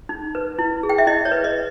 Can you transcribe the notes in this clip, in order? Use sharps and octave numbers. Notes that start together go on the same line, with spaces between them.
D#4
B4
E4
G#4
G5
E5
E4 D#5
C#5
B4
D#5